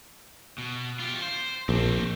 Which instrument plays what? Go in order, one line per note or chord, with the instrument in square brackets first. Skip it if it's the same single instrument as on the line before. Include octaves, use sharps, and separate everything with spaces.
[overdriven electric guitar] B2
F4 G4
C5
[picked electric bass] A#1 [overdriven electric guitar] A3 C4